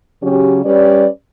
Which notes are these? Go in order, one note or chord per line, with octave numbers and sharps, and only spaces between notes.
C#3 F#3 C#4 G4
G3 C#4 G4 B4 D5